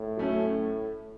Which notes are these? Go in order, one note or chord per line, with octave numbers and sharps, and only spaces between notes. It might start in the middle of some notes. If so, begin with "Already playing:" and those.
Already playing: A2
F#3 A3 C#4